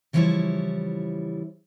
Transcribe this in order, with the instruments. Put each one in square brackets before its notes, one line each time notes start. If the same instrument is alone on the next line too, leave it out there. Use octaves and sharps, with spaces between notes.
[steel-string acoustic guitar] C#3 E3 F3 G3 E4 C#5